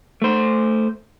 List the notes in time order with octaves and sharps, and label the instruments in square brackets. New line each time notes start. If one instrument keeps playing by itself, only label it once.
[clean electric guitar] A3 C5